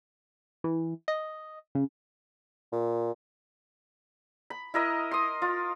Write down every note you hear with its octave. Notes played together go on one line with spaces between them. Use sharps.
E3
D#5
C#3
A#2
B5
E4 A#4 D#5
C6 D#6
F4